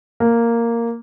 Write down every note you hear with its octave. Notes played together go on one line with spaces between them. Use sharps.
A#3